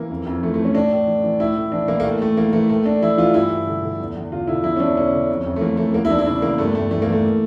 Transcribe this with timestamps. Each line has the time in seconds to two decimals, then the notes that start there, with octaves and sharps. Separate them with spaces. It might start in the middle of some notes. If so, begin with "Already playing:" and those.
Already playing: E3 A#3
0.11 F2
0.26 F2
0.43 E3 A3
0.54 A3
0.60 E3
0.65 C#4
0.75 A2 D4
0.92 A2
1.07 E3
1.24 E3
1.40 A2 E4
1.56 A2
1.72 E3 D4
1.88 E3 A#3
2.00 A#3
2.04 A2 A3
2.21 A2 A3
2.37 E3 A#3
2.53 E3 A3
2.69 A2 A3
2.86 A2 D4
3.02 E3 E4
3.18 E3 F4
3.34 G2 E4
3.51 G2
3.67 D3
3.83 D3
4.00 E2
4.16 E2
4.31 D3 F4
4.47 D3 E4
4.64 E2 E4
4.76 C#4
4.80 E2 D4
4.97 D3 C#4
5.13 D3
5.29 F2
5.46 F2
5.56 A3
5.61 E3 A#3
5.77 E3 A3
5.94 E2 A#3
6.05 E4
6.09 E3 D4
6.19 E4
6.26 C#3 D4
6.42 E2 A#3
6.58 G2 A3
6.75 G2 A3
6.91 E3 A3
7.02 A#3
7.07 E3 A3